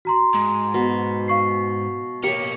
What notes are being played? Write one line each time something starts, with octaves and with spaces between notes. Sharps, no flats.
F#4 A#5 C6
G#2
B2
F5 C#6 C7
B2 A#3 G4 C#5 C#7